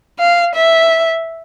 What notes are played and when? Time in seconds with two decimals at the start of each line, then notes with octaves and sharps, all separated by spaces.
0.19 F5
0.55 E5